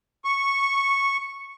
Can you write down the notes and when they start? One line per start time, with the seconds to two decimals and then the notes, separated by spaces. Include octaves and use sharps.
0.25 C#6